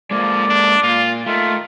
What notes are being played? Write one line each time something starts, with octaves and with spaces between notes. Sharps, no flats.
F3 G#3 A#3 D5
D4
A#2 F4
D#3 A3 F4